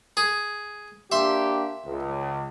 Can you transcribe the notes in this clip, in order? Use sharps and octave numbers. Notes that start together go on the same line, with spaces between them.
G#4
A#3 D4 G4 E5 C6
C#2